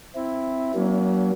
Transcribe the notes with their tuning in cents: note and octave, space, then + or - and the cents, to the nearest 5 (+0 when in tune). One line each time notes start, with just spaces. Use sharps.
C4 +0 E4 +0
F#3 +30 A#3 +30 D4 -45